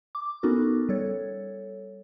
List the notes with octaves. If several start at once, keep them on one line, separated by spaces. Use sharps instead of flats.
D6
B3 C#4 D#4 F#4 A4 A#4
G3 A4 C#5